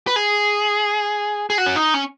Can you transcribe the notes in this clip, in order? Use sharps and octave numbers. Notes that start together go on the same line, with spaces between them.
B4
G#4
G#4
F#4
C#4
D#4
C#4